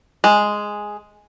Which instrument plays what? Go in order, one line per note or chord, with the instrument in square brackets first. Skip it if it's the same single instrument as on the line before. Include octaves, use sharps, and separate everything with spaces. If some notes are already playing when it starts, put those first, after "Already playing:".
[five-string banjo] G#3